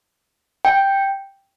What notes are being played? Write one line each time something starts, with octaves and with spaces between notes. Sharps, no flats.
G5